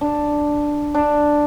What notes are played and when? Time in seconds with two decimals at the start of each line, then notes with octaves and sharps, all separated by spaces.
0.01 D4
0.95 D4